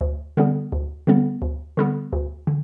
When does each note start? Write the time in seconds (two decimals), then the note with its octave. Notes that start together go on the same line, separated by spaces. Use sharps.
0.01 D2
0.37 D3 G3 B3
0.72 D2
1.07 D3 G3 B3
1.42 D2
1.77 D3 G3 B3
2.13 D2
2.47 D3